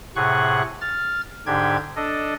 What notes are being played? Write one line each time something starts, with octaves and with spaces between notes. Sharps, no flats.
A2 C3 G#4 F#5 C#6 F#6
F6 A6
G#2 D3 D4 G4 G5 G#6
D4 A4 D#5